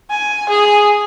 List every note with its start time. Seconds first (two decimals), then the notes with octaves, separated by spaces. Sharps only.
0.10 G#5
0.49 G#4